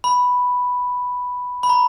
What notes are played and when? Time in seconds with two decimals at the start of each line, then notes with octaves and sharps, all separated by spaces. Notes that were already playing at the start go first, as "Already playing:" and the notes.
0.04 B5
1.63 B5
1.69 A#5